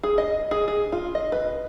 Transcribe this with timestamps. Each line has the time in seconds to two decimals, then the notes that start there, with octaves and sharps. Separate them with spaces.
0.03 G#4
0.18 D#5
0.51 G#4
0.68 G#4
0.92 F4
1.15 D#5
1.32 B4